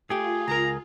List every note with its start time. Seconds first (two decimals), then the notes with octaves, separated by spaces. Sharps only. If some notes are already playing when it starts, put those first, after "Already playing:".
0.10 A3 F4 G4 G#4
0.48 C#2 A#4 A#5